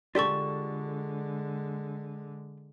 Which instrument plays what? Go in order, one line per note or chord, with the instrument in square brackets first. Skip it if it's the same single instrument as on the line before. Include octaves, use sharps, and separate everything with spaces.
[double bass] D3 G#3 [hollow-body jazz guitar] F4 G4 A4 [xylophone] D5 C#6